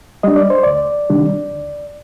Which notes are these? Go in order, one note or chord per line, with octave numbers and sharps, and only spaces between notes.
G3 D4 D#5
D5
C5
D2 D5
C3 D#3 G3 D4
D2